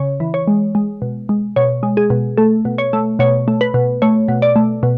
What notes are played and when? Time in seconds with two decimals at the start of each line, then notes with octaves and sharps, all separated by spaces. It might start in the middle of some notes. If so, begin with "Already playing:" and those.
Already playing: C#3 C#5
0.20 E3
0.34 C#5
0.48 G#3
0.75 G#3
1.02 B2
1.29 G#3
1.56 B2 C#5
1.83 G#3
1.97 G#4
2.10 B2
2.37 A3 A4
2.65 B2
2.78 C#5
2.93 A3
3.19 B2 C#5
3.48 A3
3.61 B4
3.74 B2
4.02 A3 C#5
4.28 B2
4.42 D5
4.56 A3
4.83 B2